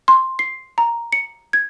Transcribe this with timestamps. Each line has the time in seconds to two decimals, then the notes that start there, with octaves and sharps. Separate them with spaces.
0.08 C6
0.39 C7
0.78 A#5
1.12 C#7
1.53 G#6